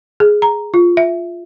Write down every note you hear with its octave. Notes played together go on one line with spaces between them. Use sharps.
G#4
A#5
F4
E5